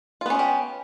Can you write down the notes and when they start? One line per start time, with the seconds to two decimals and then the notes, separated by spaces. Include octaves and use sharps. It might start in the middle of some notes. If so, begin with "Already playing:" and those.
0.21 F4
0.26 B3
0.30 C#4
0.35 G#3
0.39 G4